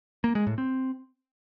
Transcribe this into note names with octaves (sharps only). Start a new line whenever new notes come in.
A#3
G#3
A2
C4